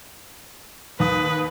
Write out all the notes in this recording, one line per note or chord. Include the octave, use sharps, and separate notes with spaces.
D#2 B4 D#6